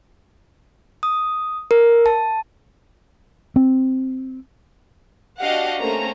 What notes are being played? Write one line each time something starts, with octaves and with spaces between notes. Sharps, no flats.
D#6
A#4
A5
C4
D4 F#4 G4 D#5 F5 F#5
A3 A#3 C4 C#4 A#5